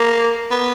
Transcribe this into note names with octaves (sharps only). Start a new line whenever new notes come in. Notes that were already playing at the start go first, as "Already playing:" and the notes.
Already playing: A#3
B3